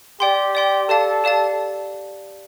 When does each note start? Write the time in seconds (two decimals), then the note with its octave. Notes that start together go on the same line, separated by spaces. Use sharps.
0.20 G4 D5 G5 C6
0.55 D5 G5 C6
0.89 G4 A4 D5 F5 A5
1.24 G4 D5 F5 A5